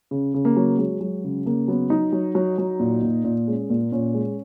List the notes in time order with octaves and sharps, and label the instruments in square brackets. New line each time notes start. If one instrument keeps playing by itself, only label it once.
[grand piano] C#3
C#3
A#3
F#3
F#3 G#3
F#3
C#3
C#3 A#3
F#3 B3
F#3 D#4
F#3
F#3
F#3
A#2
A#2
A#2
G#3 C#4
A#2 A#3
A#2 C#4
G#3